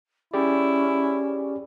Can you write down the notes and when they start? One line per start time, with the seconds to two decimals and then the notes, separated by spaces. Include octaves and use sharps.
0.34 C#4 E4 G4 G#4 D5